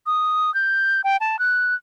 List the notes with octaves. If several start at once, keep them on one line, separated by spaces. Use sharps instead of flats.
D#6
G6
G5
A5
F#6